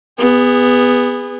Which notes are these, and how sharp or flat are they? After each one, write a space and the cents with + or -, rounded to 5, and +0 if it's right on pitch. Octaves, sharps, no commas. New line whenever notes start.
B3 +5 G#4 -25